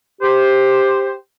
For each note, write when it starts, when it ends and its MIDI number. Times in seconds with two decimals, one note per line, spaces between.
0.22 1.12 67
0.22 1.12 72